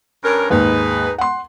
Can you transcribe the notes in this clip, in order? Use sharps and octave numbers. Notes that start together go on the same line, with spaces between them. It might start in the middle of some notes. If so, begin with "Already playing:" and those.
G2 C#4 A#4
D#2 G#2 D#4 G#4 B4
F#5 C6